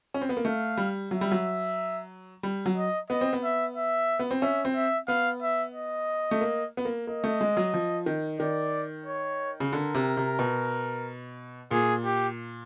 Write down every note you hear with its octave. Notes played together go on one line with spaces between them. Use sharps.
C#4
C4
B3
A#3
A3 F5
G3
F#3 E5
G3
F#3
G3
F#3
D#5
B3 D#5
C4
B3
E5
E5
B3
C4
C#4 E5
C4
E5
B3 F5
E5
D#5
A3
A#3
B3
A#3
A#3 D#5
A3
G#3
F#3
F3
D#3
D#3 D5
C#5
C#3
D3 A#4
C3
C3
B2
A#2 G#4
G4